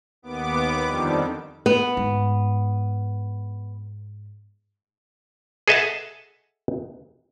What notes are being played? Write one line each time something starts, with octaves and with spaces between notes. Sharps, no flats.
D#2 B3 D6
F2 D3 D#3 G3
B3
G#2
G#4 A4 D#5 E5 F#5 A5